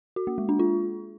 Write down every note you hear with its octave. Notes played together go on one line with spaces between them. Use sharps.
F#4
A#3
G#3
D4
F4